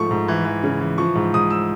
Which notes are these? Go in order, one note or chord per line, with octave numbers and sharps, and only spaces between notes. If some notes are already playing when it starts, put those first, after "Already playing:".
Already playing: G#2 F3 A3 C#6
G#2
E3
E3
C#3
E3
F3 C#6
G#2
G#2 D#6
E6